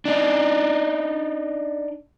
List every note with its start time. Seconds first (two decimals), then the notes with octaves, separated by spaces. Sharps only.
0.05 D4 D#4